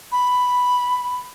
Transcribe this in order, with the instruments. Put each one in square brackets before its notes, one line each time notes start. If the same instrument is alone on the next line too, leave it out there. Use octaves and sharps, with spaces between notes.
[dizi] B5